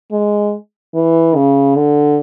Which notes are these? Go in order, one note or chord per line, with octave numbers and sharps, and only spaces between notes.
G#3
E3
C#3
D3